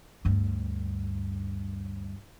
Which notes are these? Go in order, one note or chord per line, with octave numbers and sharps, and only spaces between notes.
D2 G2